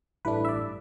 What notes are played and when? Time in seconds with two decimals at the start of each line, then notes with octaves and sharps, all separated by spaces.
0.25 A1 G2 E3 A3 D4 B4
0.45 E5
0.49 D5